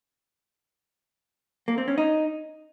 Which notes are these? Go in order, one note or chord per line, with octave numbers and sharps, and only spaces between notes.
A#3
C4
C#4
D#4